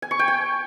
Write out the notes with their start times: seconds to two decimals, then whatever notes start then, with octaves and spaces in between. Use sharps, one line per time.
0.02 G#5
0.11 C#6
0.19 G5
0.28 G#5